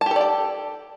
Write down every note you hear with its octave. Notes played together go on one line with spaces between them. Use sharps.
G4 A4 D5 G5 A5